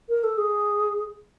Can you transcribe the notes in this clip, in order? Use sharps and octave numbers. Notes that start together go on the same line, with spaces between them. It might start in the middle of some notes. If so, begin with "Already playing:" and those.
A#4
A4
G#4